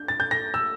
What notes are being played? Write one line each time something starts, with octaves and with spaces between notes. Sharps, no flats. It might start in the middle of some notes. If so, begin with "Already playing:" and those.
Already playing: D4 G6
A6
G6
A#6
E6